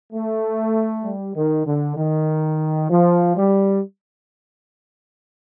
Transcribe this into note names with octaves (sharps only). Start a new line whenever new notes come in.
A3
G3
D#3
D3
D#3
F3
G3